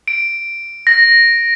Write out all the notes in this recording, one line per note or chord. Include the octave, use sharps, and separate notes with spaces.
D7
A#6